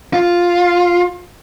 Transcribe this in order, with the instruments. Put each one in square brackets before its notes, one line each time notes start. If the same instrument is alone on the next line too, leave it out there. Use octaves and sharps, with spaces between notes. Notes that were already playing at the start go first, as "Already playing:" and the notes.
[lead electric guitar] F4